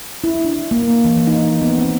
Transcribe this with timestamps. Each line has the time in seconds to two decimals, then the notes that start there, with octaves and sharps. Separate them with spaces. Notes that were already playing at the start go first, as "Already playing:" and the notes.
0.24 E4
0.45 D4
0.71 A#3
1.05 E3
1.27 D#4
1.62 B3
1.78 C4